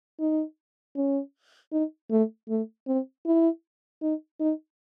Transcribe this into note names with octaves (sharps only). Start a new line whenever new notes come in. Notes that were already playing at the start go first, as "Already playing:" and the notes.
D#4
C#4
D#4
A3
A3
C4
E4
D#4
D#4